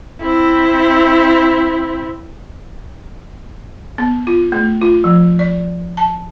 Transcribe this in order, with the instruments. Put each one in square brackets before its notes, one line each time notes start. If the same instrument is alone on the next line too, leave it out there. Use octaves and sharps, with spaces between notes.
[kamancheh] C4 E4
[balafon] B3
F4
A3
F4
F3
D5
A5